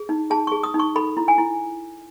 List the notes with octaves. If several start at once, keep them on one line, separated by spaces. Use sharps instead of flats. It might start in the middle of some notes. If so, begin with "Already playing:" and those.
Already playing: G#4
D#4
G#4 A5
G#4 C#6
D#6
D#4
C#6
A4 B5
E4
G#5
E4